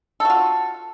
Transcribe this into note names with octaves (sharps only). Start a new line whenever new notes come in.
F4 F#4 A4